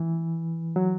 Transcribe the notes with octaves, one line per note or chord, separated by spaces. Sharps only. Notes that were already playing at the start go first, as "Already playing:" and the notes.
Already playing: E3
F#3